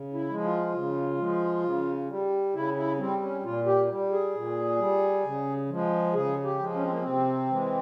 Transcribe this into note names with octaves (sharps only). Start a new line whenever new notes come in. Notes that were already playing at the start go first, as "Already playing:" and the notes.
Already playing: C#3
E4
F3 G#3
F4
C#3
F3 G#3
C#3
G3
C#3 E4
E4
G3 C4
C#4
A#2 F4
G4
G3
G#4
A#2
G3
C#3
F3 G#3
C#3 G#4
G4
F3 G#3
C#4
C4
A#3
C3 C4
E3 G#3